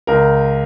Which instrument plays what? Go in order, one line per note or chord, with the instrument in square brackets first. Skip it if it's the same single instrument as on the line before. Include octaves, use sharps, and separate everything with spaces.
[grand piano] C#2 A#4